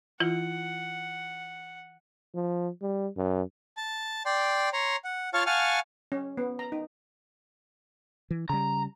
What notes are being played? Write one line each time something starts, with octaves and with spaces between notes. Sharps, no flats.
E3 E4 F4 F#5
F3
G3
F#2
A5
D5 G5 C6
C#5 A#5 C6
F#5
F4 C#5 F5 A5 C#6 F6
F5 F#5 G#5 A5 C#6 F6
C#4
B3
A#5
D#4
E3
C#3 G3 A#5